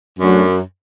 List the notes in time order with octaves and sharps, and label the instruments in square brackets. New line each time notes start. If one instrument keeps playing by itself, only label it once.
[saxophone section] F#2 [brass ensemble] F#3 A3 D4 F#4